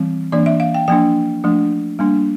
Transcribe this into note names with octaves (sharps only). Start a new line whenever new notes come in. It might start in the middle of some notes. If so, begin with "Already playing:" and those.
Already playing: E3 G3 C4
E3 A#3 D4 D5
E5
F5
G5
F3 A#3 D4 G5
F3 A3 D4
G3 A#3 D4